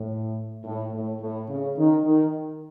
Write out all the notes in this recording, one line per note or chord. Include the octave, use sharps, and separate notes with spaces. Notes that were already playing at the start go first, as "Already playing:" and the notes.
Already playing: A2
A2
A2
A2
C#3
D#3
D#3